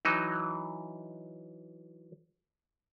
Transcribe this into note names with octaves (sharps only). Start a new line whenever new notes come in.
E3 F#3 D#4